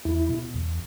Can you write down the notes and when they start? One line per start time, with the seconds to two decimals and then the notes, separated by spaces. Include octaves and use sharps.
0.05 E2 E4
0.29 B2
0.55 E2